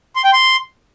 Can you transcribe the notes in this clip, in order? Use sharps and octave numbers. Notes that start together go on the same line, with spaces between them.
C6
G5
C6